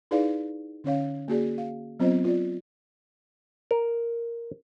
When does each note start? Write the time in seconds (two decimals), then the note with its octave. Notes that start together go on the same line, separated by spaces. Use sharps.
0.11 D#4 E4 G#4 B4 D5 F5
0.84 D3 C#4 C#5 F5
1.28 A#3 F#4 G#4 D5
1.58 F5
2.00 F#3 B3 C4 F4 C5 D#5
2.25 F4 D5
3.71 A#4